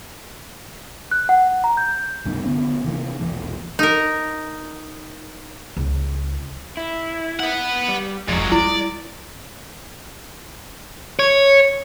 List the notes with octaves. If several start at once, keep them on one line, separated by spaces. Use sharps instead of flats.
F#6
F#5
A#5
G6
C2 G2 B2 D#3
D3 B3 C#4
C3 D#3 E3 A#3
E1 A#1 E3
D#4 A#4
C#2
E4
B4 F#5
G3
F1 A#2 F3 F#3 G#3
G3 E4 D5
C#5